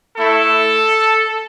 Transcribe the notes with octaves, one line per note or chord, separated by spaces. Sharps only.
A3 E4 A4